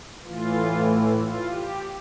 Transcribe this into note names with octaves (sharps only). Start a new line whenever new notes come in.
A2 E3 F4
F4
G4